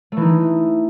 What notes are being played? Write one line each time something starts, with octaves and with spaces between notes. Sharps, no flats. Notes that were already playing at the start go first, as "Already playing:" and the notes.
E3 A3 D#4